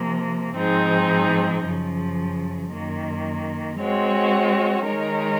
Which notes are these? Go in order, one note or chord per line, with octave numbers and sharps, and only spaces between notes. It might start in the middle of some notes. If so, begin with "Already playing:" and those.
Already playing: C3 F3 A#3
G#2 F3 C4 D#4 G#4
F#2 C#3 F3
F#2 D#3 A#3
G#3 C4 F#4 C#5
D#3 G#3 D#4 A#4 C#5